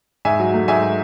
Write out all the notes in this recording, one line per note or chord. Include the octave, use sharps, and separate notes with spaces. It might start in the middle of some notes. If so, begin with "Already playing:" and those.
G#2 E5 G#5
F#3
A3
G#2 E5 G#5